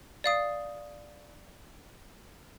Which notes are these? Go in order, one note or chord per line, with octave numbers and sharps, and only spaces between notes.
D5 F5 D#6